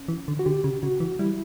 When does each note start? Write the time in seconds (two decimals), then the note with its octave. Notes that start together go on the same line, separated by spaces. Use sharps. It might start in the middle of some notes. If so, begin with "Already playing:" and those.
Already playing: C#4
0.08 E3
0.28 D3
0.39 F#4
0.46 D3 G4
0.64 C#3
0.83 C#3 F#4
1.00 E3
1.19 G3 E4